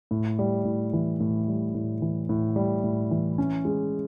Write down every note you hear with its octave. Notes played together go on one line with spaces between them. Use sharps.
A2
G3
A2
E3
A2
G3
A2
E3
A2
G3
A2
E3
C#4
G#3